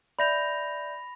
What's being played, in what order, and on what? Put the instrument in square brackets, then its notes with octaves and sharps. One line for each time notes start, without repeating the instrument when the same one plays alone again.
[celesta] D5 E5 G6 [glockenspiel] B5 A#6 F7